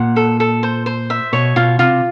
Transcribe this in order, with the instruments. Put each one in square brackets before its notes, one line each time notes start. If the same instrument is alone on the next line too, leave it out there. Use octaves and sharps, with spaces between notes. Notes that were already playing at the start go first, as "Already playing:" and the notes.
Already playing: [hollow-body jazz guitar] A#2 [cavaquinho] F#5
[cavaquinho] A4
A4
C5
C5
E5
[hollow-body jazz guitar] B2 [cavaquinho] C#5
[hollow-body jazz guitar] B2 [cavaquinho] F4
[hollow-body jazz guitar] C3 [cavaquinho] F4